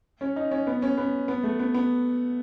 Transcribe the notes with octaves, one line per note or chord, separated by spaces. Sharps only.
C#4
D#4
C#4
B3
C#4
B3
B3
A3
B3
B3